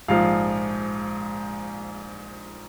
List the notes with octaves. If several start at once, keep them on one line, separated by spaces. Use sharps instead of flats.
A#1 G#2 F3 F5